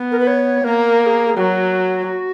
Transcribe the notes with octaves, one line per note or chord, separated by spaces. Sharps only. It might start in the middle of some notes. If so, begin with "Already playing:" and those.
Already playing: B3
A#4
B4
C#5
A#3 A#4
A#4
G#4
G#4
F#3 F#4